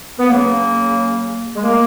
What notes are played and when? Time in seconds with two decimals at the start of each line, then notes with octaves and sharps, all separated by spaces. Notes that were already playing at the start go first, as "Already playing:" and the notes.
0.19 B3
0.29 C#3 F#3 A#3
1.56 G#3
1.64 A#3